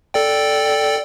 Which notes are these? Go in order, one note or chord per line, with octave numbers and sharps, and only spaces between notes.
A4 D5 G5